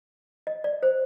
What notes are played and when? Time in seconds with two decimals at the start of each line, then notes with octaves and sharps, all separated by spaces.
0.47 D#5
0.64 D5
0.83 C5